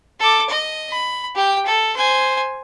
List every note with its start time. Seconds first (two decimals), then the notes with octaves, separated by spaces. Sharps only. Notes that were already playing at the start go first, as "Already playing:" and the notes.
0.20 A4 D6
0.49 D#5
0.91 B5
1.35 G4 G5
1.66 A4
1.96 C5 G#5